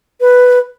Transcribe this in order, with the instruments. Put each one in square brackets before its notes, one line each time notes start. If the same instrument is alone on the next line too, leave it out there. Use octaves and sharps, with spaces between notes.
[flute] B4